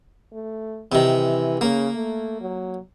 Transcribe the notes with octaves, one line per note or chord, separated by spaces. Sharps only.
A3
C3 D#3 E3
C#3 A#3
A3
F#3